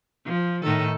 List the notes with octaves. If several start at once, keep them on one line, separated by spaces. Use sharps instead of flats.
F3
A2 D#3 A4